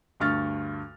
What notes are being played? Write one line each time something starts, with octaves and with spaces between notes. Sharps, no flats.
D2 G2 C#6 F6 A6